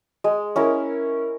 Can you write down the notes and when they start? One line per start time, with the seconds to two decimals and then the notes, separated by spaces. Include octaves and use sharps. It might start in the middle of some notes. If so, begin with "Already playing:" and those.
0.24 G#3
0.56 C#4 E4 A#4